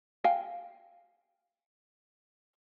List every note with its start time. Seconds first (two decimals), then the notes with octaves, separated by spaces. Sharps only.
0.24 F5 G5 G#5